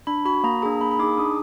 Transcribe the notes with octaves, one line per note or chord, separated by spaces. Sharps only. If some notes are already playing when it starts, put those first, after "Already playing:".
D4 B5
F#4 B5
A#3 A#5
D4 G#4 A#5
A#3 B5
B5
D#4 G#4 D6
D4 D#6